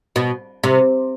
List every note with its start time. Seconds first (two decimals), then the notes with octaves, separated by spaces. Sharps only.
0.16 B2
0.64 C3